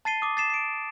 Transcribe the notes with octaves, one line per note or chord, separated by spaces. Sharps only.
A5 A6 C7 D#7 G7
D6 D#6
A6 C7 E7
C7 D7